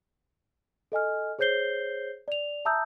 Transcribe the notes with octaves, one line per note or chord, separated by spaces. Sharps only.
A4 D#5 G#5 F6
G#4 C5 C#5 G6 C7 G7
D5 F7
E5 A5 A#5 D#6 E6 G6